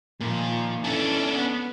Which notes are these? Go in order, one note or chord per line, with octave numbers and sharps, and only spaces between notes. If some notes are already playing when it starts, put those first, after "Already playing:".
A#2 D#3 F3
E3 C#4 D4 A4
B3